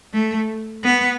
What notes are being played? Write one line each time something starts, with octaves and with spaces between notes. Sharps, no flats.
A3
B3